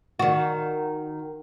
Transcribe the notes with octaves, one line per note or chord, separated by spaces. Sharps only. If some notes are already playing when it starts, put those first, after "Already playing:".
D#3 F#4